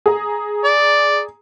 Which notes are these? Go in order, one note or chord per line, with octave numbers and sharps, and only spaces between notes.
G#4 A#5
D5